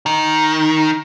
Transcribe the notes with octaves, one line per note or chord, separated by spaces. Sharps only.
D#3